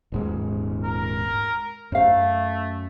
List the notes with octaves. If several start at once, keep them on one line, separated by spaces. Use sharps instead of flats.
D#1 G#2 G#3
A#4
F#2 A3 C5 F5